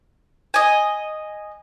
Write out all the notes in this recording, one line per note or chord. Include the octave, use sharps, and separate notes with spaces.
D#5 G#5